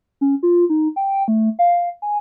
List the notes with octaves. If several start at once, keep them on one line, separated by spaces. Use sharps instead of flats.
C#4
F4
D#4
G5
A3
F5
G#5